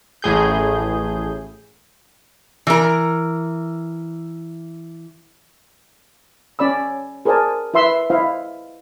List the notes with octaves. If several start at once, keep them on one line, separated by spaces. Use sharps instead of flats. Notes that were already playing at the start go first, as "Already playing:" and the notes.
A1 A2 G#4 G6
E3 A#4
C#4 D5 B5 E6
G#4 A#4 C5 D5 G#5 A5
E4 B4 E5 C6 E6
E4 C5 D#5 F5